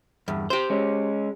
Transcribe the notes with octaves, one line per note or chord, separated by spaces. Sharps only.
E2 G2
G4 C5
G#3 C#4